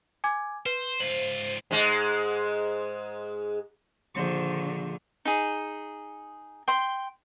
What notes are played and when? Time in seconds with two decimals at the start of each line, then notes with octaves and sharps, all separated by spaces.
0.24 G#5 D6 G#6
0.66 B4 C5
1.00 G#2 F4 C5 F#7
1.71 G#2 G#3
4.15 A#1 D3 D#3 C5 C#6
5.25 D#4 G#4
6.68 G5 C6